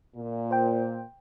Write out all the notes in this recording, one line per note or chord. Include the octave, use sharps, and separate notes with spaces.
A#2
C5 G5